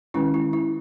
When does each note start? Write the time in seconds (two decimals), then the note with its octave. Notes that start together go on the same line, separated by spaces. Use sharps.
0.14 D#3 G#3 C#4 E4
0.34 E4
0.53 E4